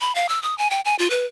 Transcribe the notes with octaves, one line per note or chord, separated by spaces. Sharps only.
B5
F5
E6
D#6
G#5
G5
G#5
F4
B4